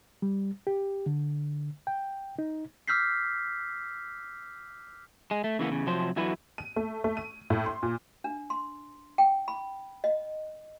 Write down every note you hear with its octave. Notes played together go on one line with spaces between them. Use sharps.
G3
G4
D3
G5
D#4
D6 E6 F6 G6 B6 C7
G#3
A3
C#3 E3 A#3 B3
E2 C#3
C3 F3 F#3 C5
E2 D3 F#3 E4 F#4 B4
D#7
A3
A3
D#7
A2
C6
A#2
D4
C6
G5
B5
D#5